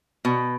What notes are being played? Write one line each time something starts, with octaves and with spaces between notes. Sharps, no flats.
B2